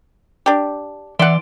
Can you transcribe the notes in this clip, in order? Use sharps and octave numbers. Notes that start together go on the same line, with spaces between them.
D4 G4
E3 D5 E5 F#5 C6